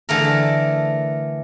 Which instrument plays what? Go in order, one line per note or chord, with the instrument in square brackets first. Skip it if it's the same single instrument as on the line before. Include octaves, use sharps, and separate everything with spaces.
[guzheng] D3 E3 A3 A#4